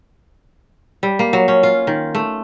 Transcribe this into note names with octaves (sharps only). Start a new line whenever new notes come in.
G3
A#3
F#3
C#4
F4
D#3
A3